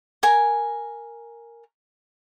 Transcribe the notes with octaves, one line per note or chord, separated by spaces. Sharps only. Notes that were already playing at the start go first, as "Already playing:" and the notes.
A#4 G#5 A#5